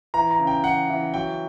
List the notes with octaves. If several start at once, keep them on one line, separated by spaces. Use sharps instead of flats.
E3 A#5
A#5
C#3
G5
E3 F#5
E3
F#3 G5